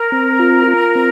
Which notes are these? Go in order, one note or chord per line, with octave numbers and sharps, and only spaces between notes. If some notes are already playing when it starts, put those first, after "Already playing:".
Already playing: A#4
C4
F4
F4
C4